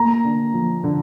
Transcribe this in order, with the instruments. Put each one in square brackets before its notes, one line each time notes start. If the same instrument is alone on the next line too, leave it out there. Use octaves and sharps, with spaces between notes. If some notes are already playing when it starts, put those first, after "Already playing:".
Already playing: [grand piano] A#3 [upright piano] A#5
[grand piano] D3
F3
D3